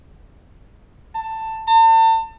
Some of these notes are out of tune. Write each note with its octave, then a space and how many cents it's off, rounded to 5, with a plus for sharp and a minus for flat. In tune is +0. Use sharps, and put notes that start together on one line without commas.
A5 +15
A5 +40